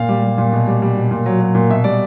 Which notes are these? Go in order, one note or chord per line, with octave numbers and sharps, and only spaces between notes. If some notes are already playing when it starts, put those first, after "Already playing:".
Already playing: A#2 F5
G3
G3
A#2
B2
G3
G3
B2
A#2
F#3
F#3
A#2
B2 E5
G3 D5